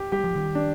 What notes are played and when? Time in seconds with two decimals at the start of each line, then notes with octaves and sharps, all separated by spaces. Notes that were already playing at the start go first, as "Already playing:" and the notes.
Already playing: G4
0.12 G3 G4
0.24 F3
0.35 D#3 G3
0.55 D4